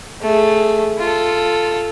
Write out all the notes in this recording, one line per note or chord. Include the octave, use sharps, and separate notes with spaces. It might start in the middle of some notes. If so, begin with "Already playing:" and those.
A3 G#4
F4 A4